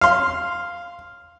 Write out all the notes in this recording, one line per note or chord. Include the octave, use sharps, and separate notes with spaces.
F5 C6